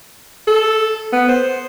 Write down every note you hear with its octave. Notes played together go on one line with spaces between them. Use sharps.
A4
B3
C5